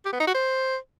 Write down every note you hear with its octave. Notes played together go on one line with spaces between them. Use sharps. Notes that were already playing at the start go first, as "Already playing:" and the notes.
G4
B3
D#4
F#4
C5